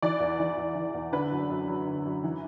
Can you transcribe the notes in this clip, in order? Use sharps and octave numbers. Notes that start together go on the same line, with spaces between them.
E3 D5
E2
E3
E2
E3
E2
D3 B4
F#2
F#2
F#3
D3
F#2
E3